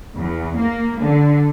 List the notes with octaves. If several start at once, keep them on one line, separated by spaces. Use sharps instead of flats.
E2
A#3
D3